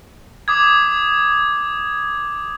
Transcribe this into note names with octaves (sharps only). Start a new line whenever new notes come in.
D6 D#6 G#6